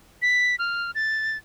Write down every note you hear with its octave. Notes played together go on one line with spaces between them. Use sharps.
B6
F6
A6